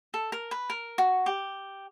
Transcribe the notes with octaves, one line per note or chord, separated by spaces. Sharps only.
A4
A#4
B4
A#4
F#4
G4